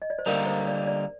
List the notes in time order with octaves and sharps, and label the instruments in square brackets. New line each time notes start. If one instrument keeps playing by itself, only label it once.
[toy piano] D#5
D5
C5
[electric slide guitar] D3 G3 A#3 D#4 [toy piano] A#4
[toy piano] C5
D5
D5